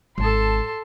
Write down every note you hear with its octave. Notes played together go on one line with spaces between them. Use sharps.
G#1 A4 A5 C6